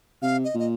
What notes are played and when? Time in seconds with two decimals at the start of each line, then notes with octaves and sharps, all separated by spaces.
0.22 C3 F5
0.44 D#5
0.55 A#2 D#5